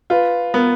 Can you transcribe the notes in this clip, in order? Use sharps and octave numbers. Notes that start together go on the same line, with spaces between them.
F4 B4
B3 A#4